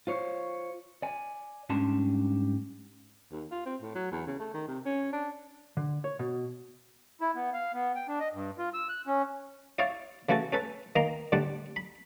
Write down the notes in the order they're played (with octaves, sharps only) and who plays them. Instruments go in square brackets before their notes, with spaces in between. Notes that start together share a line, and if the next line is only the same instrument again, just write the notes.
[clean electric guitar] F4 C5 C#5
D5 G#5
G#2 G3 C#4 D4 A5 C6
[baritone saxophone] D#2
F4
C4
A2
F#3
E2
C#3
A3
D#3
C3
C#4
D4
[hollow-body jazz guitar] D3
C#5
B2
[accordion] E4
B3
F5
B3
G5
D4
D#5
G2
F4
E6
F#6
C#4
[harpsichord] E4 C#5 D5 F5
C#3 E3 A3 F#4 A4
C#4 A4 B4
D#3 A#3 A#5 C6
A2 D3 G3 D4 F#5
B5